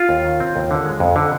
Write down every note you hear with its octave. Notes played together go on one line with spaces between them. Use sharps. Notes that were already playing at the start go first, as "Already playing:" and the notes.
Already playing: F4
D#2
D#3
C4
D#2
D3
G#3
F2
D3